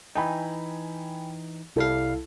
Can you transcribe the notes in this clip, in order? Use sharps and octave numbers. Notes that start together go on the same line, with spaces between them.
E3 D#4 G5 G#5 B5
C2 G3 E4 A4 F5